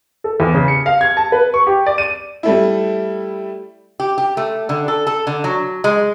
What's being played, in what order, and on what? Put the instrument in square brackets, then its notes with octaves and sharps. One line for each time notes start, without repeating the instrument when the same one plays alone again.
[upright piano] A4
E2
C#3
C#7
F5
G#6
A5
B4
C#6
G4
D5
D#7
[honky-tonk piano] G3 A3 E4
[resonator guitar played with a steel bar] G4
G4
A3
D3
A4
A4
D3
F#3
G#3